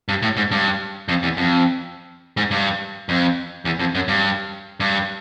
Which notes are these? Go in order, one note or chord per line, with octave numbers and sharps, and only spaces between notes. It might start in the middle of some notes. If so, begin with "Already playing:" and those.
G2
A2
G#2
G2
F2
E2
F2
G#2
G2
F2
E2
F2
F#2
G2
G2